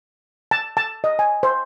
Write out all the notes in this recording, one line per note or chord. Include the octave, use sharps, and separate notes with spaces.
A5
A5
D#5
G#5
C5